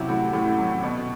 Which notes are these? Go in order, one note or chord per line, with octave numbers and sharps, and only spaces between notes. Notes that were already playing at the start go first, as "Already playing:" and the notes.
Already playing: C3 F#3 E4
A2 F#4
A2
F#3
B2